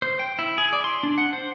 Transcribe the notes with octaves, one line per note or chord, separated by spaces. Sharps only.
C5
G5
E4
G#4
D5
C6
D4
F#5
C5